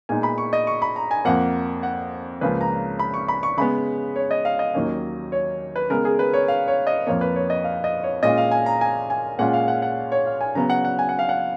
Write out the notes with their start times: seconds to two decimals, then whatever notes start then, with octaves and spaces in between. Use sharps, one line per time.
0.09 A#2 G#3 B3 D#4 G#5
0.23 B5
0.38 C#6
0.53 D#5
0.67 C#6
0.82 B5
0.96 A#5
1.11 G#5
1.25 F2 F3 A#3 F#5
1.83 F#5
2.41 C#2 C#3 F3 A#3 C#4 B4
2.61 A#5
2.99 B5
3.14 C#6
3.28 B5
3.43 C#6
3.57 C#3 G#3 B3 B5
4.16 C#5
4.31 D#5
4.45 F5
4.59 D#5
4.74 D#2 D#3 F#3 A#3 C#4
5.32 C#5
5.76 B4
5.90 C#3 G#3 B3 A#4
6.05 G#4
6.19 B4
6.33 C#5
6.48 F5
6.68 C#5
6.87 D#5
7.07 F2 F3 A#3 C#5
7.21 B4
7.36 C#5
7.50 D#5
7.64 F5
7.84 D#5
8.03 C#5
8.23 A#2 G#3 C#4 F4 D#5
8.37 F5
8.51 G#5
8.66 A#5
8.81 G#5
9.10 G#5
9.39 A#2 G#3 C#4 F4 F#5
9.53 F5
9.68 F#5
9.82 F#5
10.12 C#5
10.26 F5
10.41 G#5
10.55 C#3 F#3 B3 A#5
10.70 F#5
10.85 F#5
10.99 G#5
11.09 F#5
11.19 F5
11.29 F#5